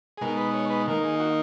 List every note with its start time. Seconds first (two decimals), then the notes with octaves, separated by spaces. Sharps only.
0.18 G#4
0.21 B2 G#3 D#4 A#4
0.37 B4
0.54 C#5
0.70 B4
0.87 D#3 A#3 D#4 A#4
1.03 G#4
1.20 F#4